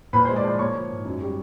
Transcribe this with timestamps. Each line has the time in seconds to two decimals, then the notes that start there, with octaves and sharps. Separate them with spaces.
0.13 A#2 B4 B5
0.25 G#3 C5 C6
0.36 D5 D6
0.44 F3 C5 C6
0.59 A#3 C#5 C#6
0.75 F3
0.90 G#2
1.05 F#2
1.21 G3